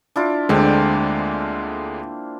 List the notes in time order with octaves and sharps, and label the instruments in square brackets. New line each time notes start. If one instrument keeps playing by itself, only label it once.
[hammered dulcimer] D4 E4 F4
[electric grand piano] D2 D3 G#3 [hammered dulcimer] A#3 C4 D4